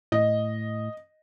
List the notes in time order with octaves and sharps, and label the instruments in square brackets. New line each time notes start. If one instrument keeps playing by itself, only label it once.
[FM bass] A2 [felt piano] D#5